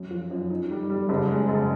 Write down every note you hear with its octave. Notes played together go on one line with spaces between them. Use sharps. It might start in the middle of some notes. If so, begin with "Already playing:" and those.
Already playing: F#2
F3
F#2
D#4
G3
G3
F#1
G#3
F#1